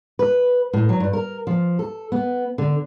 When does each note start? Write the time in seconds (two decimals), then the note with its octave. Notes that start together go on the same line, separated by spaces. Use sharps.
0.19 B4
0.73 A2
0.89 F#3
1.00 G2
1.13 A#4
1.47 F3
1.79 A4
2.12 B3
2.58 D3